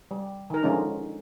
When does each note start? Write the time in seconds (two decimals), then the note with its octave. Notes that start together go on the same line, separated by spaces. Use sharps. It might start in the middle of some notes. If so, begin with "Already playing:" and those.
0.11 G3
0.50 D#3 A#4
0.63 D3 F3 G#3 C#4 D#4